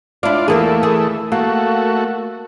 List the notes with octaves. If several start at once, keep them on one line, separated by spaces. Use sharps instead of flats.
D4 E4 F4 D5
E2 E3 A3 A#3 G#4
G#4
A3 A#3 F#4